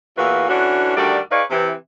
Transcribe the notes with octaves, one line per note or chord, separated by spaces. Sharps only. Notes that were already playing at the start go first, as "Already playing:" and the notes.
E2 A#2 E3 F#4 F5
D3 E3 C#4 D4 F#4
D2 D#3 G3 F#4 D5
D#4 G#4 B4 C#5 D5 F5
C3 E3